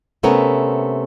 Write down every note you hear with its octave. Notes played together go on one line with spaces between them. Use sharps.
C3 A3 B3 C#4 A#4